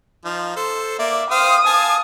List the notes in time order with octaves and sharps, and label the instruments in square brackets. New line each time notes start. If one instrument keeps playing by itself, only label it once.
[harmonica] F3 D#4
A4 C5
[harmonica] A#3 D5 [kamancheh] E5
[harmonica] C5 F5 G5 [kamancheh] D#6
[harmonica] F5 G#5 A5